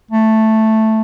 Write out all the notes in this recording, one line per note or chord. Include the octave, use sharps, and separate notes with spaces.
A3